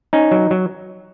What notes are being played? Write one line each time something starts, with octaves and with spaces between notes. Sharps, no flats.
C#4 D#4
F#3
F#3